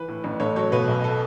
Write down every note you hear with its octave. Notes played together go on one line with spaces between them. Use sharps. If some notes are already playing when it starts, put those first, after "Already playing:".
Already playing: E3 B4
A2
A1
A1 A4 C#5
F#3 A4 C#5
B2 B4
B1
A4